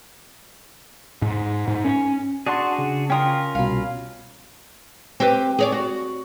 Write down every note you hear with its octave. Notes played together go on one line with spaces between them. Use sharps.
G#2
G#2
C#4
D4 F#4 G#4 D5 F#5 A5 C6
C#3
C#4 F4 A#4 G5 D#6
C2 B2 F5 B5
C4 G4 B4
G#4 C#5 D5
F#4